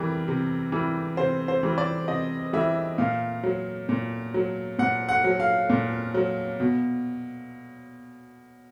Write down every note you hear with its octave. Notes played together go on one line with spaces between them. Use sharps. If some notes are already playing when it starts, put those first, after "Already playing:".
Already playing: C3 E3 G3 A#4
C3
E3 G3
C3 C5
C5
E3 G3
D5
C3 D#5
E3 G3 E5
A#2 F5
F#3
A#2
F#3
A#2 F#5
F#5
F#3
F5
A#2
F#3
B2